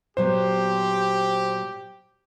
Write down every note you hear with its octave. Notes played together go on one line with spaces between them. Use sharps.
A#2 F#3 B3 G4 C5